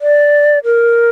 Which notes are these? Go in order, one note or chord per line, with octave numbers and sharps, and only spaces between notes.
D5
A#4